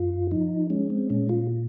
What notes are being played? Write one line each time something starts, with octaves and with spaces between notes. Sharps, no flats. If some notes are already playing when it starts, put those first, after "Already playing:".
Already playing: F#2 F4
F3 D#4
G#3 C#4
C4
A#2 C#4
F4